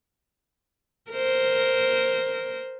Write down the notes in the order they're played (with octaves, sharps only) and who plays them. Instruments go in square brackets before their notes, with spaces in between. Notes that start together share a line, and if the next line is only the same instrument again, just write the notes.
[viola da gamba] A#4 C5